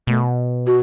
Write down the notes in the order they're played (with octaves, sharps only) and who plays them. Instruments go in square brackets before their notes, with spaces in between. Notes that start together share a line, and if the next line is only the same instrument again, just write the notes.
[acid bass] B2 [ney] A3
[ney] F#4